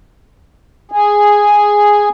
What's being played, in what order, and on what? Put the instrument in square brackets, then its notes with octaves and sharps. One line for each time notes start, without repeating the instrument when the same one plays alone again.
[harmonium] G#4